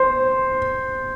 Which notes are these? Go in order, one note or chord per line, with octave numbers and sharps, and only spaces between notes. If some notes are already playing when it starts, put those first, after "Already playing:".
Already playing: C5